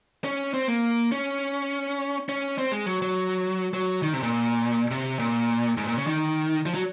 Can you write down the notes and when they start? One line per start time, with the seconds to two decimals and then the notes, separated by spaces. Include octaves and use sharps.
0.24 C#4
0.54 C4
0.68 A#3
1.12 C#4
2.29 C#4
2.58 C4
2.72 G#3
2.86 F#3
3.02 F#3
3.74 F#3
4.03 D#3
4.14 C3
4.23 A#2
4.91 C3
5.19 A#2
5.78 G#2
5.87 A#2
5.97 C#3
6.07 D#3
6.66 F3
6.75 F#3